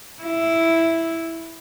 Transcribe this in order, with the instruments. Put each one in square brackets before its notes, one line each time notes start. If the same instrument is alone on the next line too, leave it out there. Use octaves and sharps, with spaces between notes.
[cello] E4